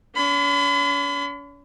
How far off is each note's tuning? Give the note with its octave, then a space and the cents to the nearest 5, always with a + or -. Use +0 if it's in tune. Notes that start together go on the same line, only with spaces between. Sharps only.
C#4 +40 B5 +40